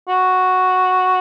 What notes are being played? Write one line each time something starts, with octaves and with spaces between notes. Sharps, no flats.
F#4